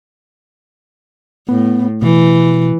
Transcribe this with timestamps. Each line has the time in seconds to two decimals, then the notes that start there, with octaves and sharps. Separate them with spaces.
1.49 A2 B3
2.02 B2 E3